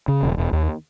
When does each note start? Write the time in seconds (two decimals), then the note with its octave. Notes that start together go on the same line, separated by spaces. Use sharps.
0.08 C#3
0.23 E1
0.38 E1
0.53 D#2